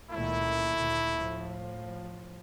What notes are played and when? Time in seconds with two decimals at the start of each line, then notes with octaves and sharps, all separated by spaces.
0.11 C#2 A#2 D#3 A3 E4
0.74 D2 A#2
1.17 A2 F3